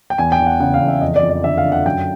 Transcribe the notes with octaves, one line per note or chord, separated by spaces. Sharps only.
G5
E2 G#5
G5
E2
F#5
C#3 F#5
F5
E2
E5
F2 D#5
D5
F2
D5
D3 E5
F5
D3
F#5
F#2 G5